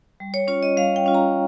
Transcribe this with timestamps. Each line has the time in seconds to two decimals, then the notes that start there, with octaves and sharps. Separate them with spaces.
0.20 G3
0.34 C#5
0.48 C#4 F4 C#5
0.63 D#5
0.77 G3 F5
0.96 G5
1.06 C#4 F4
1.14 A#5